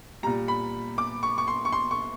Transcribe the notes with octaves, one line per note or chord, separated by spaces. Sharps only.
A#2 G3 A#5
B5
D6
C#6
C#6
C6
C#6
C6
C#6